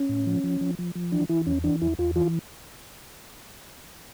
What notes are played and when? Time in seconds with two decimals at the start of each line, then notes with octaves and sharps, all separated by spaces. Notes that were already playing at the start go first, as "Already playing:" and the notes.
Already playing: C#4
0.09 A2
0.26 F3
0.44 F3
0.61 F3
0.79 F3
0.95 F3
1.12 E3 D4
1.29 E3 E4
1.47 E2 C#4
1.64 E3 D4
1.82 E2 E4
1.99 E2 F4
2.16 E3 F4